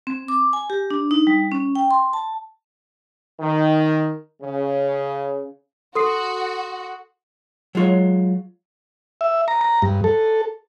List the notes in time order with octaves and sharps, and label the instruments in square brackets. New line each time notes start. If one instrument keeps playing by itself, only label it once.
[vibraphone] C4
D6
G#5
G4
D4
D#4
G3
C#4
G5
C6
A5
[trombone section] D#3
C#3
[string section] F#4 [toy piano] A4 [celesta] C6 D#6 C7
[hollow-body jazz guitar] F#3 G#3 F4 C#5
[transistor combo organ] E5
A#5
A#5
G2
A4